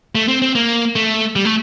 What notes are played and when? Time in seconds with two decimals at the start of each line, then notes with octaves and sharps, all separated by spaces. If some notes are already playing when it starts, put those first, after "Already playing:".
0.15 A3
0.28 C4
0.42 C4
0.55 A#3
0.96 A3
1.36 G3
1.45 A3